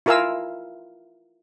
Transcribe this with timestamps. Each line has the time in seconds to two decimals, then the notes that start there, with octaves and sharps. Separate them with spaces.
0.06 E4 F4 A#4 F5 G#5 E6